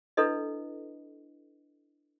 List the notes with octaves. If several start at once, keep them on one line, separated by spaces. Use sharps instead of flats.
D4 E4 A4 B4 D#5